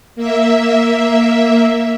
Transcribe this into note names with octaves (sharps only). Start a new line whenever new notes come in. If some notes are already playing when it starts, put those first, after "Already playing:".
A#3 E5